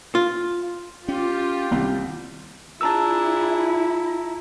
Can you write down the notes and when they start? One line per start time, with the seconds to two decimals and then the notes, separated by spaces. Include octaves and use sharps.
0.15 F4
1.08 C#4 F4 G4
1.71 C2 D#3 G3 C4
2.81 D4 E4 F4 G#4 A5 A#5 E6